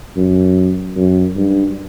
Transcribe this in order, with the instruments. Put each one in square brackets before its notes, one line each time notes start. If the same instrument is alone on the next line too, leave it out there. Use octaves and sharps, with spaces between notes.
[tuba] F#2
F#2
G2